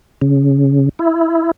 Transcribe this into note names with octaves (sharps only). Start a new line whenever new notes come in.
C#3
E4